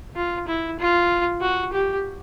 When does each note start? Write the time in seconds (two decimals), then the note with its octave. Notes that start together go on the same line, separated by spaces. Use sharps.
0.16 F4
0.47 E4
0.79 F4
1.41 F#4
1.73 G4